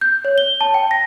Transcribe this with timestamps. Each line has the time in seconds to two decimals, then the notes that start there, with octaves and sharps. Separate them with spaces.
0.01 G6
0.25 C#5
0.38 G7
0.61 A5
0.74 G5
0.91 A#6